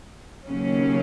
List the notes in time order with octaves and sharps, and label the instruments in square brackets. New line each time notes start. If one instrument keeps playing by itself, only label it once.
[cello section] D#2 C#3 F#3 C#4